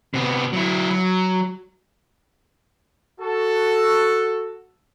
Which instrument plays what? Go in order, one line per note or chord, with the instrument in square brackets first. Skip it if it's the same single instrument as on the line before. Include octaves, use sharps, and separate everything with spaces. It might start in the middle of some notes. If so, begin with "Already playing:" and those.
[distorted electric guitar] C3 B3
F#3 E4
F#3
[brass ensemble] F#4 A4